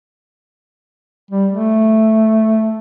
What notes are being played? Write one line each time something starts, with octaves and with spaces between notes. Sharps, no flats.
G3
A3